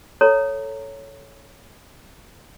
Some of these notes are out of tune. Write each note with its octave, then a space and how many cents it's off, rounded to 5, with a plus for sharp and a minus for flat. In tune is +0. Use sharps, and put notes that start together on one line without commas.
A4 +0 C#5 +0 A#5 -20